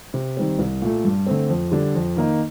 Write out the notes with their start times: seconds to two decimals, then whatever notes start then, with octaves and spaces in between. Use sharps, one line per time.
0.14 C3
0.37 D#3 G3 C4
0.59 C2
0.82 A#2 A3
1.05 G2
1.27 D3 A3 C4
1.50 F2
1.72 D3 G3 D4
1.95 F2
2.16 D#3 A#3 D#4